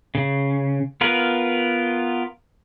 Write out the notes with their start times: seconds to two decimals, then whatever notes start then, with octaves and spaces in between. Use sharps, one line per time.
0.15 C#3
1.01 B3 F4 A#4 B4